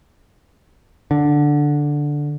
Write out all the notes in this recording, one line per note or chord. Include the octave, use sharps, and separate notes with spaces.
D3